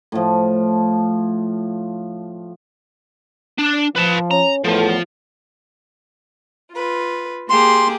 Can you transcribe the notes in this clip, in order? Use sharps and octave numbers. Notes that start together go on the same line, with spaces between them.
A2 F3
D4
F3 B4 A5
C#4 A#5
E2 A2 F3 B3 A4
F4 B4
A#3 G4 G#4 C6